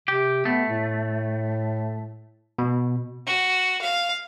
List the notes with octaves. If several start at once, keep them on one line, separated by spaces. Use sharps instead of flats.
C3 G4
A3 B3
A2
B2
F#4
F5